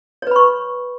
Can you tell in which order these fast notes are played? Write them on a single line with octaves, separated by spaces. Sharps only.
C#5 B4 B5 C#6